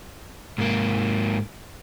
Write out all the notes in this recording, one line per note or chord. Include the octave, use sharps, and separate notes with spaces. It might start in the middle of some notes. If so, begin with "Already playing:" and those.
G#2 A#3